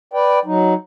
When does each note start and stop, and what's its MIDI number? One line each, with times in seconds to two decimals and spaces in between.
0.13 0.39 71
0.13 0.39 74
0.13 0.39 79
0.45 0.74 54
0.45 0.74 63